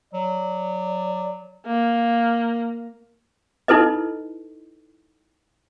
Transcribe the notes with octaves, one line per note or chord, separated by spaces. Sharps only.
F#3 D5
A#3
D#4 E4 A4 B4 D#5